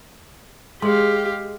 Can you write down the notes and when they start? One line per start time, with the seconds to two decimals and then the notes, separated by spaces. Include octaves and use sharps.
0.82 G#3 G4 G#4 F5 C6